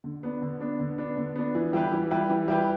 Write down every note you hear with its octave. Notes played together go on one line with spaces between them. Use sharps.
D3
B3 D4
D3
B3 D4
D3
B3 D4
D3
B3 D4
E3
G3 E4 G4 B4
E3
G3 E4 G4 B4
E3
G3 E4 G4 B4